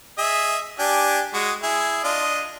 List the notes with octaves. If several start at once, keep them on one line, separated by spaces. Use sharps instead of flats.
G#4 D#5 E5
D4 G4 G#5
G#3 F#4
E4 G#4
D4 F4 D#5